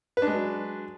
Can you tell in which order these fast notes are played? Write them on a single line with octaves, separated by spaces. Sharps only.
B4 D4 G#3 F#3